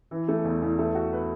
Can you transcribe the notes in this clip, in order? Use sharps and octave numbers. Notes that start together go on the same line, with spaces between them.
E3
A3
E2
E2
A3
F#4
B4